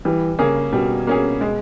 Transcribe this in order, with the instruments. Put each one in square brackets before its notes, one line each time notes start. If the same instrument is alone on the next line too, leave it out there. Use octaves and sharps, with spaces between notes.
[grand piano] E3 [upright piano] G3
[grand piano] C#3 [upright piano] A#3 C#4 G#4
[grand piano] B2 [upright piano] G3
[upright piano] A#3 C#4 G#4
G#3